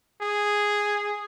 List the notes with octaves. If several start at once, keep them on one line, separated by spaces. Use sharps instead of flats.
G#4